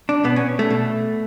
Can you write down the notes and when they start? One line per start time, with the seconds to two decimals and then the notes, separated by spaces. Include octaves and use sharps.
0.09 D4
0.24 B2 B3
0.36 C#4
0.59 A3
0.70 B2